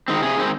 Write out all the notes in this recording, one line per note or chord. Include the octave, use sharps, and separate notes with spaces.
D#3 G#3 C4
C3 G#4
D#3 G#3 C4